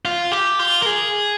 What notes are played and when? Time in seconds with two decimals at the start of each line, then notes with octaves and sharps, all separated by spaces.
0.05 F4
0.32 G4
0.59 F4
0.82 A#4
0.86 G#4